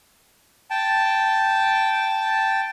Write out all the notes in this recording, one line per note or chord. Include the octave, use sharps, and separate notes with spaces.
G5 A5